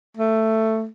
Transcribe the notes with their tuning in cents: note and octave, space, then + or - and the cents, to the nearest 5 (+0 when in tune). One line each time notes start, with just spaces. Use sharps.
A3 +10